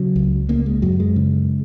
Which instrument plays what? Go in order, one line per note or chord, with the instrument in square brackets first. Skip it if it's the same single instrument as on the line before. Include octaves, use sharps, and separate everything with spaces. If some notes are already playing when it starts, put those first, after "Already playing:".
Already playing: [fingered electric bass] C#3 F#3
C#2
C#3 A#3
G#3
F#2 F#3
G#3
C#3